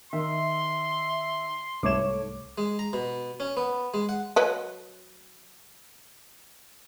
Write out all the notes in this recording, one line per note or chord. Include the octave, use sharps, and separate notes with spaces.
D#3 E5 C6
C2 G#2 A3 C#5 D6 E7
G#3
A#5
B2
C#4
B3
G#3
F#5
F#3 B4 D#5